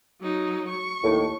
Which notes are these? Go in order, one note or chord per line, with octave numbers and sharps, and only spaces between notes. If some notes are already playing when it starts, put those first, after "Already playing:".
F#3 D#4
C#6
D#2 A2